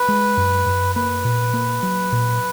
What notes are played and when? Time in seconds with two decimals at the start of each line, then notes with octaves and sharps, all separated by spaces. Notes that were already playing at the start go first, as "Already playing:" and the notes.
Already playing: B4
0.09 G#3
0.37 F#2
0.66 F#2
0.96 A#3 B4
1.25 A#2
1.54 A#3
1.83 F#3
2.12 A#2